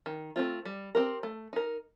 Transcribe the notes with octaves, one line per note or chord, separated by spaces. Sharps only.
D#3
A3 C4 F4
G3
C4 G4 A#4
A3
D#4 A#4